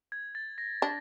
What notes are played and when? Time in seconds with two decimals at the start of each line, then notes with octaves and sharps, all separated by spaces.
0.12 G#6
0.35 A6
0.58 A#6
0.82 D4